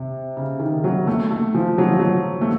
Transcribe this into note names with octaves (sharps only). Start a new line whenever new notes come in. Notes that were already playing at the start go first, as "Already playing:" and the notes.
Already playing: C3
C#3
D#3
F#3
A3
A3
F3
F#3
F3
F#3
A3